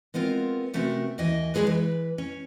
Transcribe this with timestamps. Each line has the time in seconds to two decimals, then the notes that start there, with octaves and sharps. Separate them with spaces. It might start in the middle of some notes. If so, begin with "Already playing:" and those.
0.14 G#3 B3 C4 F4 A#4
0.74 C3 A3 C4 C#4 F#4 A#4
1.18 D#2 E3 D#5 G5 G#5
1.54 F#3 G#3 C#4 G#4 A4 B4
1.67 E3 B4
2.18 C#4